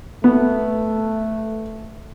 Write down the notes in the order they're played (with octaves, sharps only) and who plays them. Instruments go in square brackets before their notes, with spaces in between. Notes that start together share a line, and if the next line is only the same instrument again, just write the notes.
[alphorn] A3 [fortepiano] B3